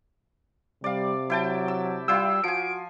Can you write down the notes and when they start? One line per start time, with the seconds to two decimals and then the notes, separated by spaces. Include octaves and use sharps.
0.84 C3 G3 D5 F5
1.30 F#3 E4 G5 A5
1.68 E6
2.08 G3 E4 F4 G5 E6
2.44 F3 F#4 G#5 D7